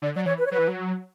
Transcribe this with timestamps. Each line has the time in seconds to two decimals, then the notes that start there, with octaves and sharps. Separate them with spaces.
0.02 D3 D5
0.15 F#3 D5
0.26 E3 C#5
0.38 B4
0.45 C#5
0.51 F#3 B4
0.58 E3
0.68 F#3